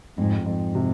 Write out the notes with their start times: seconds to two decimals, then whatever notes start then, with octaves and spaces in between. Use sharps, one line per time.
0.18 F2 G#2
0.46 F2 G#2
0.75 C3